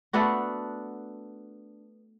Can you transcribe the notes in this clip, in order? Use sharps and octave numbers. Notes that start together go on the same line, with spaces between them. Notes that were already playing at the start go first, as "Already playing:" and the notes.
A3 B3 D4 F#4